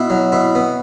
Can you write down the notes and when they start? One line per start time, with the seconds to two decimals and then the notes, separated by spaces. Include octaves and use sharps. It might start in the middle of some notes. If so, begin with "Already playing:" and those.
Already playing: B2 E4
0.10 F#3
0.32 B2 E4
0.55 B3